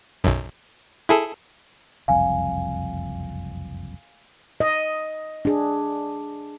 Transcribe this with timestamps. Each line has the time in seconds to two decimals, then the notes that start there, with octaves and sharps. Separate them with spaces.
0.24 B1 F#2
1.09 E4 G#4 A4
2.08 F#1 C2 F2 F5 G#5
4.60 D#5
5.45 D4 G#4